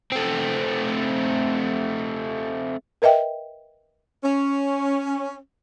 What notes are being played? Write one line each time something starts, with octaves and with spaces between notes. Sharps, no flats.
A3 C4
A#4 B4 D#5 E5 G5
C#4